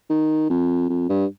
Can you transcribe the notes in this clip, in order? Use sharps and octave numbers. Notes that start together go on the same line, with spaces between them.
D#3
F2
F2
G2